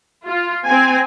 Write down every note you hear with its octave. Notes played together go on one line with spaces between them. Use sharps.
F4
C4 G#5